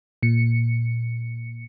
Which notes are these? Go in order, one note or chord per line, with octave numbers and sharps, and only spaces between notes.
A#2 C#7